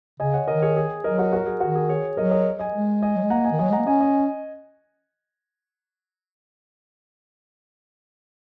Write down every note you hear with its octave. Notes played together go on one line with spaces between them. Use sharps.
C#3 D#5 G#5
C#5 F#5
D#3 A#4 D#5
G#4 C#5
G#4
F#3 A#4 D#5
F#4 A#4
F#4 A#4
G#4
D#3 F#4
G#4
G#4 C#5
F#3 A#4 D#5
A#4 D#5
D#5 G#5
G#3
D#5 G#5
F#3
G#3
A#3 F#5 A#5
D#5 G#5
D#3
F#3 D#5 G#5
G#3 F#5 A#5
A#3
C#4 D#5 G#5
D#5 G#5